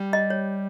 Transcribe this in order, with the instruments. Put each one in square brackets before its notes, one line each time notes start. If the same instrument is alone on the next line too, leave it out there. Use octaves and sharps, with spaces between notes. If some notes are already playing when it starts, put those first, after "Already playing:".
Already playing: [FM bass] G3
[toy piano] D#5
C#5